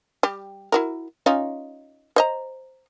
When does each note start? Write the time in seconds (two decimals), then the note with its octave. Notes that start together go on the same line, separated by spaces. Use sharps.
0.23 G3 G4
0.72 E4 F#4 A#4
1.26 C#4 D#4 F4
2.16 C5 D#5 A#5